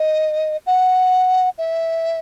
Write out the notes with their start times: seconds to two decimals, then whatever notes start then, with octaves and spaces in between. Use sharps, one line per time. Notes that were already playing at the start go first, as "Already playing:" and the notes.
Already playing: D#5
0.67 F#5
1.58 E5